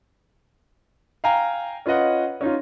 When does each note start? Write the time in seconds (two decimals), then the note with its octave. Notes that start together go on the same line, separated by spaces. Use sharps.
1.24 F5 G5 G#5 A#5
1.86 C#4 F4 B4 D#5 F#5
2.41 C#4 D#4 F4